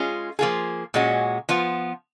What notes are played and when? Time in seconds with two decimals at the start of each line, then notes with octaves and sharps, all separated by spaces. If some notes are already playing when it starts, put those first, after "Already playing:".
Already playing: G#3 C#4 F4 G#4
0.39 F3 A#3 F4 G#4
0.94 A#2 G#3 C#4 F#4
1.49 F3 B3 F4